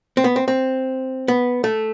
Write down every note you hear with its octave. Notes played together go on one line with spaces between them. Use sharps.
C4
B3
C4
C4
B3
A3